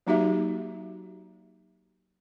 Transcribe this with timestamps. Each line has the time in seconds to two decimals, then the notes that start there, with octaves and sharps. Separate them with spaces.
0.07 F#3 A#3 D#4 F#4 G4 E5